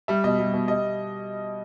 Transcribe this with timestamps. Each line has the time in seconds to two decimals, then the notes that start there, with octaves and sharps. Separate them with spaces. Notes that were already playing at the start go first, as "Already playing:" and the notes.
0.08 G3 E5
0.24 B2 D#5
0.39 G3
0.54 B2
0.68 G3 D#5